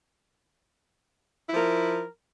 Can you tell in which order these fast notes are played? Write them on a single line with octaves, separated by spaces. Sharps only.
E4 F3 A#4